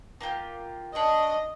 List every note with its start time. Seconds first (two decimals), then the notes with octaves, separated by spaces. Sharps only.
0.21 A#3 F4 G4
0.95 D4 C#5 D#5